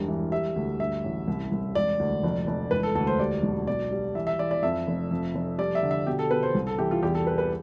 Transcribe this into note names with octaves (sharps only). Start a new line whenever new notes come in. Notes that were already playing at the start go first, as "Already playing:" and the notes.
Already playing: E1 G2
E3
G3 E5
D2
G2 E5
A1
C2
C2
E1 D5
D2
F1
F1
E1 B4
A4
D2 A4
C5
G3 D5
B1
B2 D5
G3
E3 E5
E5
E3 D5
D5
F2 E5
F1
F2
F1
G3 D5
E5
D3
E5
B2 G4
A4
B2 B4
C5
C2
A4
E3 G4
F4
E2 G4
A4
E2 B4
B4